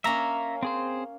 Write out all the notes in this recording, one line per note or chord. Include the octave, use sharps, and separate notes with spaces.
A#3 C#4 E5 A#5
C4 G#4 C5